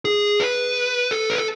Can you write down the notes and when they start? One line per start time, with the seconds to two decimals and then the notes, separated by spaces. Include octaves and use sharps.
0.05 G#4
0.40 B4
1.11 A4
1.30 B4
1.38 A4